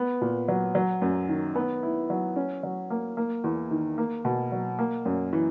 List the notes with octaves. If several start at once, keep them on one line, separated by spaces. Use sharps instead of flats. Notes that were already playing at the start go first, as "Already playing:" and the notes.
Already playing: B3
A#2
F#3
F#3
F#2
D#3
B3
E4
F#3
C#4
F#3
A#3
A#3
E2
D#3
A#3
B2
F#3
A#3
F#2
E3